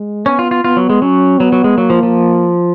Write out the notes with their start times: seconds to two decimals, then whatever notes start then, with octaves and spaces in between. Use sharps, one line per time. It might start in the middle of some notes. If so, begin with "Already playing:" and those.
Already playing: G#3
0.26 B3 C#4
0.39 F4
0.51 F4
0.64 B3 F4
0.77 F#3
0.90 G#3
1.02 F#3 C#4
1.40 F#3 B3
1.52 F#3
1.64 G#3
1.77 F#3 A#3
1.90 F3
2.03 F3